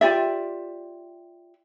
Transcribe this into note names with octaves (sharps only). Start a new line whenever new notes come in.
F4 G4 D5 E5